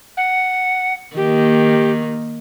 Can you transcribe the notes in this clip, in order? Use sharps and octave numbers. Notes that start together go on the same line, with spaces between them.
F#5
D#3 A#3 G4